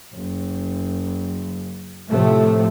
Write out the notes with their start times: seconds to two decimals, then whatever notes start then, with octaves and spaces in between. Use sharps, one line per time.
0.14 F#1
2.11 A2 C3 F3 A3